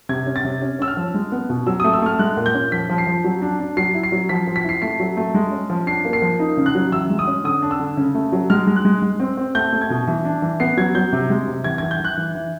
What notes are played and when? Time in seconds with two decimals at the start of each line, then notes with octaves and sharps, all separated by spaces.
0.09 C3 G#6
0.27 C#4
0.36 A6
0.44 C3
0.62 C#4
0.79 C#4 E6
0.88 F6
0.97 F3
1.14 G#3
1.32 B3
1.50 B2
1.66 F#3 E6
1.80 A3 D#6
1.93 E6
2.02 A3 F6
2.19 G#3 F#6
2.37 A#2
2.46 G6
2.54 C#4
2.72 F3 B6
2.90 F3
2.98 C7
3.07 F3
3.24 F#3
3.42 D4
3.60 D4
3.77 F#3 C7
3.95 E4
4.03 C7
4.12 F#3
4.29 F3 B6
4.47 F3
4.56 B6
4.64 E4 C7
4.82 A3 C7
5.00 F#3
5.17 A3
5.35 G#3
5.52 C#4
5.70 F3
5.87 D4 C7
6.05 A#3
6.13 C7
6.22 F3
6.40 D#4
6.57 C#3
6.66 F#6
6.75 F#3
6.92 E3 E6
7.10 G#3
7.19 D#6
7.27 C#4
7.44 D3 D#6
7.62 D4
7.71 E6
7.80 D3
7.97 C#3
8.15 A3
8.32 F#3
8.50 G#3 F6
8.67 G#3
8.76 F#6
8.85 G#3
9.02 G#3
9.20 C4
9.37 C4
9.55 A3 G6
9.73 A3
9.81 G#6
9.90 B2
10.07 E3
10.25 D4
10.42 E3
10.60 B3 C7
10.77 F#3 G#6
10.95 F#3 G6
11.13 C3
11.30 G#3
11.47 C3
11.64 E3 G#6
11.78 E3 G#6
11.91 G6
12.00 E3 F#6
12.17 E3
12.35 E3